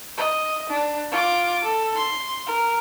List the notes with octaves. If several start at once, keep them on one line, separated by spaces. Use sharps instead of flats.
D#5
D4
F4 D6
A4
C6
A#4